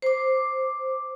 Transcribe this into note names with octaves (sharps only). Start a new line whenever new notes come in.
C5 D6